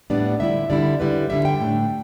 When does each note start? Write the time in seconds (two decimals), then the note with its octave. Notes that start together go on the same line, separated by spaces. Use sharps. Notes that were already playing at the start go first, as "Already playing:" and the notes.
0.10 A2 G3 B3 D4 D5
0.40 D3 G3 E4 E5
0.70 D3 G3 E4 D5
1.00 D3 G3 E4 B4
1.30 D3 G3 E4 E5
1.45 G5
1.61 A2 A3 D4